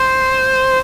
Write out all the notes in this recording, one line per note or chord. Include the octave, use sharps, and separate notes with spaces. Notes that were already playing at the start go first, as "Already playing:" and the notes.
Already playing: C5